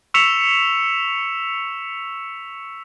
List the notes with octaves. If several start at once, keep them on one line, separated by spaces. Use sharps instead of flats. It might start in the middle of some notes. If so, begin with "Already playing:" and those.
C#6 E6 B6 C#7 E7 F7